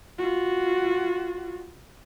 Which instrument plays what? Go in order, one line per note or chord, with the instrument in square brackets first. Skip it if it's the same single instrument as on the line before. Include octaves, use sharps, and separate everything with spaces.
[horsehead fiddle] F4 F#4